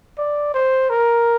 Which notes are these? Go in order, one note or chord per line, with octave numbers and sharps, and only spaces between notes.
D5
C5
A#4